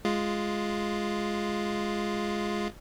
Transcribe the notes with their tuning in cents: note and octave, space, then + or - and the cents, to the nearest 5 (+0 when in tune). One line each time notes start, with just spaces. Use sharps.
G#3 +0 F4 +0